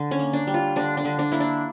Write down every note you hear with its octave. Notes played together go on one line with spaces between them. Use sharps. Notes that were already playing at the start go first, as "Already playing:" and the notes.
Already playing: D3
C#4
A#3
D4
G3
F4
D3 D4
D4
D3
D4
A#3 E4
D4